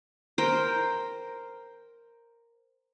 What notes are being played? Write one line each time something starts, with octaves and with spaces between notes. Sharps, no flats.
A#4 C5 G5